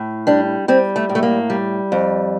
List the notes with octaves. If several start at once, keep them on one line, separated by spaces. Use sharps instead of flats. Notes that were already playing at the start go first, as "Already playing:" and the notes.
Already playing: A2
G3 D4
G3 C4
A3
A2
A3
A#3
G3
F2